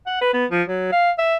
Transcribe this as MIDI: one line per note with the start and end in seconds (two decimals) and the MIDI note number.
0.07 0.19 78
0.21 0.32 71
0.33 0.45 59
0.51 0.62 53
0.69 0.87 54
0.92 1.11 77
1.18 1.37 76